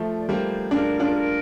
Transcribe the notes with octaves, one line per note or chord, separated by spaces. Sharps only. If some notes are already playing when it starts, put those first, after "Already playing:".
Already playing: F3 A3
D5
G3 A#3 C5
A#3 D4 A#4
D4 F4
A#4